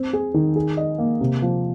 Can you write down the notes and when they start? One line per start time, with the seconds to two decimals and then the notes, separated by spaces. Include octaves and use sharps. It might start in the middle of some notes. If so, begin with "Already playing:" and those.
Already playing: C4
0.13 G#4
0.34 D#3
0.56 G#4
0.77 D#5
0.98 A#3
1.21 C3
1.42 F3